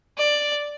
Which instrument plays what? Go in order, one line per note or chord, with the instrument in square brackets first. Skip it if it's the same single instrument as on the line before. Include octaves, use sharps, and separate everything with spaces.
[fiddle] D5